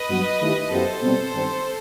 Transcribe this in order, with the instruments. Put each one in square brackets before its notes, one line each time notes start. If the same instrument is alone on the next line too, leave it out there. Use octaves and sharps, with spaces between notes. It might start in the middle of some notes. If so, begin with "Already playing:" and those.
Already playing: [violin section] B4 D#5
[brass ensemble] G2 F#3 B3 F#4
D#3 A3 E4 G4
[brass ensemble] F#2 F#3 B3 E4 G4 [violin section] A4 C5
[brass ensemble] B2 G3 C4
G2 D#3 G3 C4